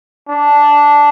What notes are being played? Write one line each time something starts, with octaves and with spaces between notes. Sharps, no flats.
D4